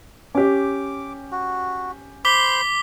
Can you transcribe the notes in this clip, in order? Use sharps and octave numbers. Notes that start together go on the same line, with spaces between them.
C#4 G4 D6
F#4
C5 B5 C6 D6 B6 G7